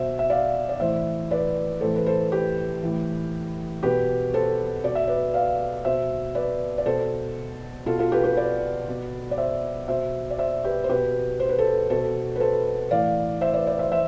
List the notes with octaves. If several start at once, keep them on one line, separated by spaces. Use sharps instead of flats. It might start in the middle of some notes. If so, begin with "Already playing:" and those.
Already playing: B2 C5 E5
E5
D5 F5
D5
A2 E3 C5 E5
B4 D5
A2 E3 A4 C5
B4
A4 C5
G4 B4
A2 E3
B2 G4 B4
A4 C5
B2 D5
E5
B4 D5
D5 F5
B2 C5 E5
B4 D5
D5
B2 A4 C5
B2 F4 A4
F4 A4
G4 B4
G4 B4
B4 D5
B2
D5
C5 E5
B2 C5 E5
D5
C5 E5
G4 B4
C5
B2 G4 B4
C5
B4
A4 C5
B2 A4 C5
B4
A4 C5
A2 E3 D5 F5
C5 E5
B4 D5
B4 D5
C5 E5
E3 C5 E5